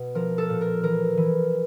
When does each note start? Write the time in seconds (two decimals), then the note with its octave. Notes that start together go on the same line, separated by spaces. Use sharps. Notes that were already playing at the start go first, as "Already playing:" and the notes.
Already playing: B2
0.15 F3 A#4
0.38 A4
0.49 A#2
0.61 A#4
0.83 E3 A#4
1.17 E3